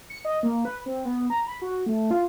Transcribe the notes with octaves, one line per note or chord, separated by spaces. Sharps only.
C#7
D#5
A#3
B4
C4
B3
A#5
B5
F#4
A3
F4